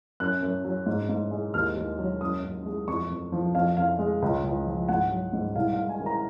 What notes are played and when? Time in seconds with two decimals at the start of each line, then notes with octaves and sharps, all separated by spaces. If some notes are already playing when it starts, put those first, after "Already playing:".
0.20 F#2 F#6
0.43 F#2
0.64 F#3
0.86 G#2
1.09 G#2
1.31 G#3
1.54 D#2 F6
1.77 D#2
1.99 F#3
2.21 F#2 D#6
2.44 F#2
2.66 G#3
2.88 F2 C#6
3.10 F2
3.32 F3
3.54 F2 F5
3.77 F2 F5
3.99 G#3
4.22 C#2
4.44 C#2
4.66 F3
4.89 G#2 F#5
5.11 F#3
5.33 G#2
5.56 C2 F5
5.72 F5
5.77 G#3
5.89 G#5
6.00 D#3
6.06 A#5